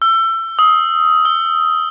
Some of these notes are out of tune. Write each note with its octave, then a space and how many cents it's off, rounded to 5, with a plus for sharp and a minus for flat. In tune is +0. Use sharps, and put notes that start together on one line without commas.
E6 +30
D#6 +20
E6 +30